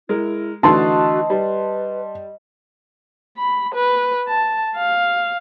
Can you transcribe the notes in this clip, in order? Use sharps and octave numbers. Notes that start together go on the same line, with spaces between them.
G#3 E4 A#4
D3 E3 A3 F#4 D#5 A5 C6
G3 B4
B5
B4
A5
F5